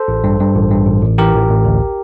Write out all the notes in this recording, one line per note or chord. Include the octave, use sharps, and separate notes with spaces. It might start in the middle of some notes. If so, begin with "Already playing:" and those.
Already playing: A4 C5
A1
G2
G2
A1
G2
A1
A1
E3 G4 A#4
A1
A1
D2